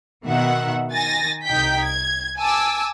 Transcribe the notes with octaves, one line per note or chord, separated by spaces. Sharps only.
B2 D#3 E5 F#5
D#3 G#5 A6 A#6
C2 D#4 G5 G6 B6
G#6
G#5 A5 D6 E6